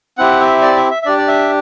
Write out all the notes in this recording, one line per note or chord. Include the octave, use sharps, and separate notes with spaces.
C4 E4 G4 F#5
E5
D5
E5
E5
E5
D4 G4 D5
D5
E5